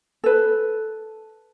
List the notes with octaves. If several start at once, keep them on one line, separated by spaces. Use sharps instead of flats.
A4 B4